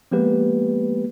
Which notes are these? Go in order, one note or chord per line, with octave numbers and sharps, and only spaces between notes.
F3 G#3 A#3 B3 G4 B4